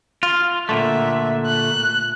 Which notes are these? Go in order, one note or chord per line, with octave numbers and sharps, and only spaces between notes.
F4
A#2 D3 A3 E5
F#6